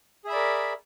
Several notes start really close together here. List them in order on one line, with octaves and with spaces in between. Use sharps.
G#4 E5 B5 D5 A#4